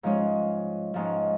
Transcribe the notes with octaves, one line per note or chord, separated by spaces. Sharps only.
G#2 F3 G#3 C#4 F4
G#2 F3 G#3 C#4 F4